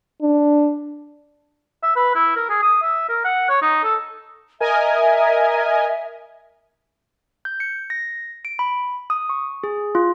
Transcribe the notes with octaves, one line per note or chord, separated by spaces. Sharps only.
D4
E5
B4
E4
A#4
G#4
D#6
E5
A#4
F#5
C#5
D#4
A4
A#4 D#5 E5 G#5
G6
C#7
A#6
D7
B5
D#6
C#6
G#4
F4